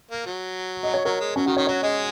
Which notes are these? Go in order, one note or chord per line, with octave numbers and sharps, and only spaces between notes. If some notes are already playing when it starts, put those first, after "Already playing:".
A#3
F#3
D#5
C#5
F#3 A#4
G#3
F#3 C#4
D#3 F#4
D#3 C#5
F#3 F#4 C#5
G#3 G#4 D#5